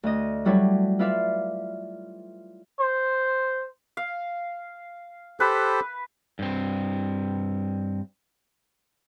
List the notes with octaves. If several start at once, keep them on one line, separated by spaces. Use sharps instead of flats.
D2 D#5
F#3 G3 E4 A4 C#5
E4 F4 B4 D5 E5 F5
C5
F5
G4 A4 B4 C5
G2 C4